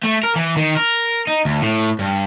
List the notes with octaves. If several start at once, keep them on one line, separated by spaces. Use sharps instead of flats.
A3
A#4
E3
D#3
A#4
D#4
D2
A2
G2